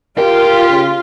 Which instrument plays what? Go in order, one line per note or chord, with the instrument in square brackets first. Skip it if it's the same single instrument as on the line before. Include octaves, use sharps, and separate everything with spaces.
[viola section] F4 [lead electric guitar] G4 [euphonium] A#4
[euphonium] C#3